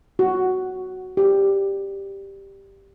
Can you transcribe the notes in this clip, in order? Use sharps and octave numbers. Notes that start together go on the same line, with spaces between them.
F#4
G4